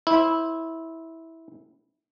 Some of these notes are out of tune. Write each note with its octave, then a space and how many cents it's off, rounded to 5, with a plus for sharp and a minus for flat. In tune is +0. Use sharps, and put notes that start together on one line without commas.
E4 -15 C5 +0